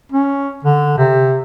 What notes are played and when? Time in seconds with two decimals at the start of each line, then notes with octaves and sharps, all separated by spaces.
0.12 C#4
0.64 D3
0.98 C3